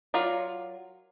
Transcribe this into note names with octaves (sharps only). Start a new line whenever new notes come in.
F#3 F4 A#4 D5